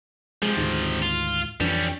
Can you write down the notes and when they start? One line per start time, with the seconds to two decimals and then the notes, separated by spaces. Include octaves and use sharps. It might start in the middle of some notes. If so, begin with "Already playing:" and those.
0.42 C3 F3 G#3
0.57 D2 G#2 D#3
1.02 F4
1.60 F2 E3 G3 C#4 D4